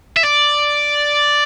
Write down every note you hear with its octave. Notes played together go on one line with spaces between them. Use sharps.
E5
D5